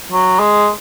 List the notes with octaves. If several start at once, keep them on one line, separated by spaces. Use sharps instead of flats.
F#3
G#3